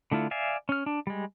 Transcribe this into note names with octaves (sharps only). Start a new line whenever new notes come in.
D3 A3 E4 F4
D5 E5 F5 G#5
C#4 F6
D4
G3 G#3